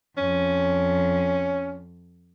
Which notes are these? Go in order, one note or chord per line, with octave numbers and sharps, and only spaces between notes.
F2 C#4